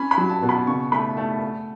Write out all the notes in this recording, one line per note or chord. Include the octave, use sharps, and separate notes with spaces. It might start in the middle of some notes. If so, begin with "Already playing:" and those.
Already playing: C#4 B5
B5
F#3
A5
B2
B5
C#3 C#6
A3 B5
A3 A5
A3